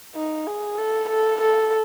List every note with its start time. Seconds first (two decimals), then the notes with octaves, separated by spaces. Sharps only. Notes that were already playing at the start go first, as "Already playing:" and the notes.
0.15 D#4
0.46 G#4
0.78 A4
1.09 A4
1.41 A4